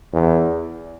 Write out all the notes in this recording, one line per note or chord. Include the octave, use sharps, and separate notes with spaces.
E2